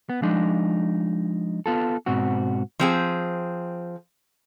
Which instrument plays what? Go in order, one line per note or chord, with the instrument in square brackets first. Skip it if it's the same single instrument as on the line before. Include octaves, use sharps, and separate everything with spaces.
[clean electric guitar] B3
F3 G#3 D4 D#4
B3 F4 A4
G#2 B2 C4 F#4
[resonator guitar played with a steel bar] F3 C4 G#4